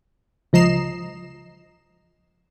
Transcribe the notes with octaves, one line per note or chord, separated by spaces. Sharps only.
C#2 F3 D#5 A#5 C7 E7